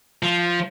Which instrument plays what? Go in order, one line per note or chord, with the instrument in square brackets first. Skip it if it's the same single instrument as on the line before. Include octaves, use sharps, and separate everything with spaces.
[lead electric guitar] F3